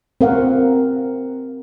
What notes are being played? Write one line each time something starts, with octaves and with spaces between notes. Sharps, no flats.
C4 A#4 F5 F#5